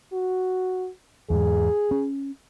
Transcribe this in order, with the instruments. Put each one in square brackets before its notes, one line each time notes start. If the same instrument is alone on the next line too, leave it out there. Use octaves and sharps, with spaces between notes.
[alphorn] F#4
[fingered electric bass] E2 G#2 [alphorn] G#4
[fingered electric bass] C#4